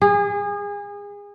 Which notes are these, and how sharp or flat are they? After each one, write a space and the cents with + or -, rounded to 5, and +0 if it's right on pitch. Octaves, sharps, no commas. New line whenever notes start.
G#4 -30